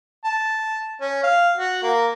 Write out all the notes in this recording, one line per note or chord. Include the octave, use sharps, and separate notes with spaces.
A5
C#4
F5
F#4
A#3